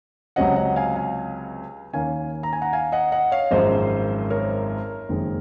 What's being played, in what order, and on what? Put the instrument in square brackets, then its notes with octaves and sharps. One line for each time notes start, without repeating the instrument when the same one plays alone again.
[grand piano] C#2 C3 F#3 C#4 D#5 F#5
D#5 F#5
F5 G#5
F5 G#5
D#2 D#3 A#3 C#4 F5 G#5
A#5
G#5
F#5 A#5
F5 G#5
D#5 F#5
D#5 F#5
C#5 F5
G#1 F#2 F3 G#3 C5 D#5
A#4 C#5
F#1 F2 D#3 G#3